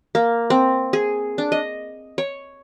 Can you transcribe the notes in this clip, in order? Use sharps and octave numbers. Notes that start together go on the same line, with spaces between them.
A#3
C4
G#4
D4
D#5
C#5